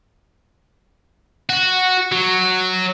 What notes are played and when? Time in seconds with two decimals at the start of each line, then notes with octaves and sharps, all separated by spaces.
1.49 F#4
2.12 F#3